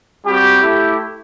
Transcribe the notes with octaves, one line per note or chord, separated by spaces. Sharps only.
G3 C4 F#4 G4
A3 E4 G4